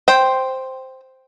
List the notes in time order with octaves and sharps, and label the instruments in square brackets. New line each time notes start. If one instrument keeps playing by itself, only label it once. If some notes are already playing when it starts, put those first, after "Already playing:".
[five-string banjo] C5 G5